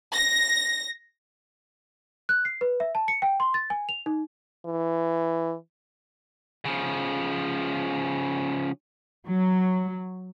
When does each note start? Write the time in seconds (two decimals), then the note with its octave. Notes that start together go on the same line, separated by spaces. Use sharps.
0.14 A#6
2.29 F#6
2.45 C7
2.61 B4
2.80 E5
2.95 A5
3.08 C#7
3.22 G5
3.40 C6
3.54 A6
3.70 G#5
3.89 F7
4.06 D#4
4.66 E3
6.65 C#3 F3
9.26 F#3